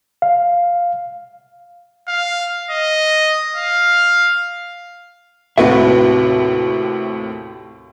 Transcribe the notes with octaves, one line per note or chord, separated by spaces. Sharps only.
F5
F5
D#5
F5
D#2 A2 C3 F#4 B4 E5